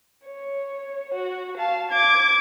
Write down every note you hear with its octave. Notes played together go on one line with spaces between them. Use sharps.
C#5
F#4
F5 A5
D6 G#6